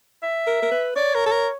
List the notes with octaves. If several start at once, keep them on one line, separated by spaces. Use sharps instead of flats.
E5
A#4
A#4
B4
C#5 D5
A#4
A4
A#4